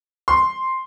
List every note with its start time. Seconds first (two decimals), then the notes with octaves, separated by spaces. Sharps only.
0.28 C6